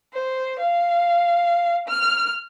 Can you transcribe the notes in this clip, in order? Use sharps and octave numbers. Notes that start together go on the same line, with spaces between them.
C5
F5
F6